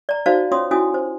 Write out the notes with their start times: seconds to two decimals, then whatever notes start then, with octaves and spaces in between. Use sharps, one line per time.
0.09 D5 A#5
0.26 D#4 F#4 C5 D5 F5 A5
0.51 C#4 F4 C#5 C6 D#6
0.71 C#4 E4 F#4 G#5 D#6
0.94 C5